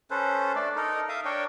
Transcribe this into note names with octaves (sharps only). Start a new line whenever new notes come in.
C#4 A4 B4 C5
A3 D4 D5
D#4 A4 A#4
E5 F5 D#6
D4 A#4 C#5 G5